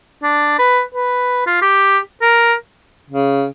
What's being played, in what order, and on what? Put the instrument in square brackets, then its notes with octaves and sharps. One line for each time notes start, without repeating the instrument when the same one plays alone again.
[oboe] D4
B4
B4
F4
G4
A#4
[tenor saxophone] C#3